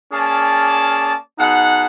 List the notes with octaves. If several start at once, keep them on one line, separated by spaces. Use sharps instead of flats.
A#3 C#4 G#4 D5 A5
B2 D#4 G#4 F#5